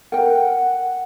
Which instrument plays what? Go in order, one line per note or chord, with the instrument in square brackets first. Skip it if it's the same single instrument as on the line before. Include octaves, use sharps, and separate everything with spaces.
[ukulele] A#4 G5 [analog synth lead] F#5